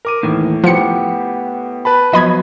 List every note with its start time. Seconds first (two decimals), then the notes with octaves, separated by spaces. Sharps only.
0.05 A#4 D6 D#7
0.23 D#2 A2 D#3 E3
0.64 F3 B3 G4 C#7
1.85 B4 A5 B5
2.13 F3 F#3 B3 D#5 B5 G#6